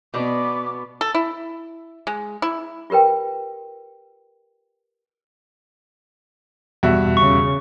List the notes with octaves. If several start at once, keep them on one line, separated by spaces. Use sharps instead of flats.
B2 B3 D5 D6
A4
E4
G#3
E4
F4 G4 A#4 B4 G5
E2 G2 B2 F#4 E5
C#3 C#6